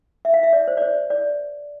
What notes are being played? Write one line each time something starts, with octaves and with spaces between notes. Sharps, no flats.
E5
F5
E5
D5
C5
D5
C5
D5